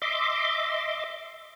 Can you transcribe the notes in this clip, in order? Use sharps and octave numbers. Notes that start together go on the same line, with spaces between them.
D#5 E5 C6 D6